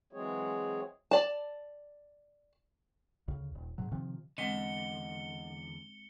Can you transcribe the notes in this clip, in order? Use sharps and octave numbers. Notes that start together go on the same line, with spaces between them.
E3 F#3 G#3 C4 G#4 C#5
D5 A5
D2 C#3
D#1
G#2 C3 F#3
C3 D#3 F3
E2 D3 G#3 C4 D#5 F#5 C#7 G7